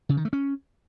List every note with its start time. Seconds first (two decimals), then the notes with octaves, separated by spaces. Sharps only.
0.09 C#3
0.17 D#3
0.25 A3
0.33 C#4